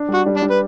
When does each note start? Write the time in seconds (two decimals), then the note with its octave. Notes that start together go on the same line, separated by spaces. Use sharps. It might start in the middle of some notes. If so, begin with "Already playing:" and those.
Already playing: D4
0.09 G3
0.14 F#4
0.26 G3
0.37 D4
0.42 G3
0.50 B4